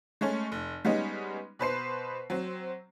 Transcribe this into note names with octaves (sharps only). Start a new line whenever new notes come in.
G#3 A3 C#4
F1
G3 G#3 B3 C#4 D#4
B2 B4 C5 C7
F#3 C4